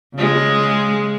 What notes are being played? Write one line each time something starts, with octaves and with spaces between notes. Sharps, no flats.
C#3 G#3